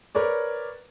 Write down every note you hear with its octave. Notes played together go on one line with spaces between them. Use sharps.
A#4 B4 C#5 D5